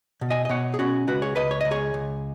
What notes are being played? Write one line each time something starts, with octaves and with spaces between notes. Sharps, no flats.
B2
D#5 G#5
D#5
B2 C#5 F#5
G#4
B2 C#4 F#4
C#2 F#4 B4
G#4 C#5
C#2 B4 D#5
C#5
C#2 D#5
G#4 C#5
C#2